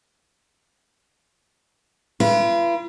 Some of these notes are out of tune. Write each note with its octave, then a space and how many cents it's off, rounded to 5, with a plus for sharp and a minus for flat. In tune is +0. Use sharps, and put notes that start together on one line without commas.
F4 -45 B4 -25